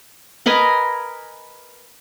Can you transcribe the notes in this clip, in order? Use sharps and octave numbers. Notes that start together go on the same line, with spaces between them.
A#4 B4 D#5 G#5